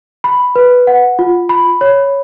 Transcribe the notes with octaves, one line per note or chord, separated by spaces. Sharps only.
B5
B4
F#5
F4
B5
C#5